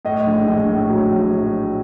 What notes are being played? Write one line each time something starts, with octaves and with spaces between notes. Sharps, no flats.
A2 D#5
A#1
A#1
A2
F#3
A#1